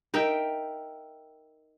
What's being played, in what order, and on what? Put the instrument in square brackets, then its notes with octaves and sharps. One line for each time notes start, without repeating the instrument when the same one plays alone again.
[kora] D#4 A#4 E5 G5